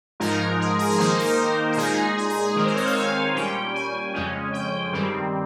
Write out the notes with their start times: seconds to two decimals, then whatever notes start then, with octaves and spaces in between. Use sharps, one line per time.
0.20 G#2 F3 G#3 D#4 A#4
0.60 G#4
0.79 G#4
0.89 A#4
0.98 D#3 A#3 D#4 C5
1.18 A#4
1.25 C5
1.34 A#4
1.72 A#4
1.77 A#2 G#3 D#4 G#4
2.17 G#4
2.30 G#4
2.56 D#3 G#3 C4 A#4
2.66 C5
2.76 C#5
2.85 F5
2.95 G#5
3.35 A#2 G3 C#4 G5
3.74 G#5
4.14 F2 C#3 G#3 C#4
4.53 G5
4.92 G2 D#3 G3 C4